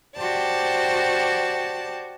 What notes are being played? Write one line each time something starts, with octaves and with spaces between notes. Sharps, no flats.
F#4 G4 C5 D5 A5